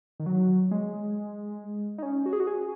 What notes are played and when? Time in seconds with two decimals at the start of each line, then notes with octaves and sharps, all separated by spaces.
0.20 D#3
0.26 F#3
0.71 G#3
1.98 D#4
2.03 C#4
2.26 F#4
2.33 G#4
2.40 F#4
2.47 G#4